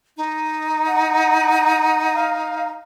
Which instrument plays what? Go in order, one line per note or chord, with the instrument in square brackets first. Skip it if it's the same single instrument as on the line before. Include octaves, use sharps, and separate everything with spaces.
[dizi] D#4
[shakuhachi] F#5
F5